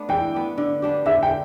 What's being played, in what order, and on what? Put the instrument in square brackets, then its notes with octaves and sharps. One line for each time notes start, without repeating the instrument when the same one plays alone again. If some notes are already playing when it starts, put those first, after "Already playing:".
Already playing: [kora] A3 B3 D4
[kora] E3 [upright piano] G5
[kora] B3 D4
D3
B3 D4 G4
[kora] D3 [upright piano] E5
[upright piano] G5